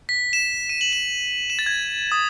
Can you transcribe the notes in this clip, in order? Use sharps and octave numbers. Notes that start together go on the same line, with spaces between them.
B6
E7
D#7
F#7
E7
E7
A6
G#6
D#6